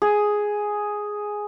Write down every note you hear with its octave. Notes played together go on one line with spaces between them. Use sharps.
G#4